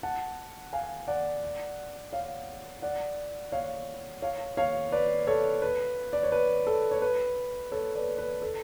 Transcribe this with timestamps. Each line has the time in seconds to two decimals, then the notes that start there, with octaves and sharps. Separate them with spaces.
0.03 F#5 A5
0.73 F5 G#5
1.08 D5 F#5
2.12 C#5 F5
2.82 D5 F#5
3.52 C#5 F5
4.22 C#5 F5
4.57 C#5 F5
4.92 B4 D5
5.27 A4 C#5
5.62 B4
6.13 D5
6.23 C#5
6.32 B4
6.67 A4
6.91 C#5
7.02 B4
7.72 A4 C#5
7.95 B4 D5
8.18 B4
8.42 A4